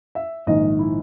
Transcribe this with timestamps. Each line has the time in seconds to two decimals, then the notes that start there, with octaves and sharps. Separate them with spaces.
0.15 E5
0.47 A#1 G#2 D#3 D#5
0.79 E4